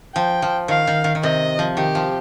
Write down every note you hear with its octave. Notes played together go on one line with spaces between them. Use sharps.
F3 G5
F3
D#3 F5
D#3
D#3
D#3
C3 D#5
F3
D#3 G4
F3